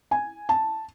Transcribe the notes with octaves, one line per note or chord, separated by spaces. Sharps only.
G#5
A5